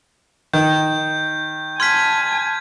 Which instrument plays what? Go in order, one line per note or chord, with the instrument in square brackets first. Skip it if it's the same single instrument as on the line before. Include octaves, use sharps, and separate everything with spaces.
[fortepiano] D#3 [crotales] G6
[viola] G#5 A5 [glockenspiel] C6 F6 B6 [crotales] G#6